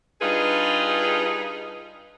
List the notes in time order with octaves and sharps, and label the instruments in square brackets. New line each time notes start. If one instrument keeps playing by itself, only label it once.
[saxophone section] G3 D4 D#4 F4 G#4 B4